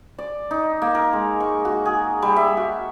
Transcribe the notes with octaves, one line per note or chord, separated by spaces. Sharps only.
D5
D#4
A#3
A#4
G#3
C#6
F#4
G#4
G3
E5
F#4